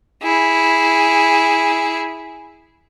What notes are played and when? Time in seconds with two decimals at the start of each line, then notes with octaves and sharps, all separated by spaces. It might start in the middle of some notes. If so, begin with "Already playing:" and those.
0.23 E4 G#4